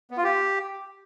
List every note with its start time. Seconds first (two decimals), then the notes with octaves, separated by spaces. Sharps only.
0.11 B3
0.17 F4
0.24 G4